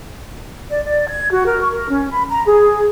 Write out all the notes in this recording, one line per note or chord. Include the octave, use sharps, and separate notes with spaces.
D5
D5
G#6
F#4
A#4
C#6
A#4
C#4
B5
A#5
G#4